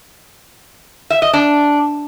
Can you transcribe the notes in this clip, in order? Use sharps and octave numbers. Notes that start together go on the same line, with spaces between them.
E5
D#5
D4